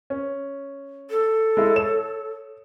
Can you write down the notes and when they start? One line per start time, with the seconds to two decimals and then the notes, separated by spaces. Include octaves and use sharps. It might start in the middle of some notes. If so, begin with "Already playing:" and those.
0.10 C#4
1.10 A4
1.57 G#3 E4
1.76 C#5 E7